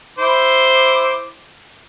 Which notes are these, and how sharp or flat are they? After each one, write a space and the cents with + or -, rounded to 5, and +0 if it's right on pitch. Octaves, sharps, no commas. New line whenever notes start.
E4 +0 C5 +0 D6 +0